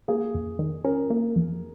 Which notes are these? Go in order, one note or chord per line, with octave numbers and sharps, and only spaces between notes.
A#3 G#4
F2
D#3
C#4 A#4
A#3
F2